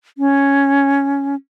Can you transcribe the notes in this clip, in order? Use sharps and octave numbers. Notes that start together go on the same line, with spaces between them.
C#4